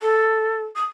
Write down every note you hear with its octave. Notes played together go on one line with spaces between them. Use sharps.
A4
D#6